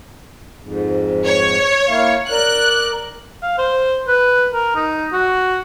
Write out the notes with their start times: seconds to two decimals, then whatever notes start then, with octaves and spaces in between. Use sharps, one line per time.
0.62 F2 G#2
1.27 C#5
1.87 A#3 E4 F5
2.31 A#4 D5 F#6
3.42 F5
3.58 C5
4.07 B4
4.52 A#4
4.75 D#4
5.12 F#4